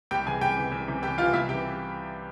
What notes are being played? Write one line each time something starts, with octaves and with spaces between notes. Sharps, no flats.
C2 G4 G5
C3 E3 G#4 G#5
C2 G4 G5
C3 E3
C2
C3 E3
C2 G4 G5
C3 E3 F4 F5
C2 E4 E5
C3 E3 G4 G5